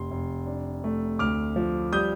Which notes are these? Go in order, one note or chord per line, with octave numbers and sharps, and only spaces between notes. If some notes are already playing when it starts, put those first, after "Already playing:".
Already playing: F1 C6
F1
D4
A3
D2 D6 F6
F3
G3 D#6 G6